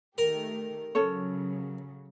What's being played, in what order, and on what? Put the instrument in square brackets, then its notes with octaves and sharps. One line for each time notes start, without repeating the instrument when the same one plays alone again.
[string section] D#3 A3 G4 [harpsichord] A#4
[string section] C#3 F#3 [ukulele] C#4 A4 C#5